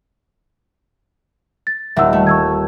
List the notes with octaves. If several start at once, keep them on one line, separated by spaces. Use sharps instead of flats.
A6
D#1 D#3 E5 F#5 E6
A3
C#6 E6 G#6